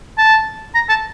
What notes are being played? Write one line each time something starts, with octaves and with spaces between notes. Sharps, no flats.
A5
A#5
A5